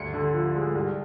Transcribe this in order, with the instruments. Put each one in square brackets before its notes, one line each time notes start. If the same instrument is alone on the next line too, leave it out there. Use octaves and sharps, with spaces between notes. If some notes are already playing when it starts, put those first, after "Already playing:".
Already playing: [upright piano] D2 C#7
D3
F3
G#3
C2